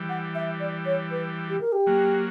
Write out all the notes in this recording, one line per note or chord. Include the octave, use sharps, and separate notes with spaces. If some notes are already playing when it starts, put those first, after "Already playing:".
Already playing: E3 G3
F#5
E5
D5
C#5
B4
G4
A#4
G4
F#3 A#3